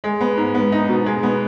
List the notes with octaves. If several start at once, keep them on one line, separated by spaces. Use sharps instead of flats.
G#3
B3
G#2
B3
D#4
B2
G#3
B3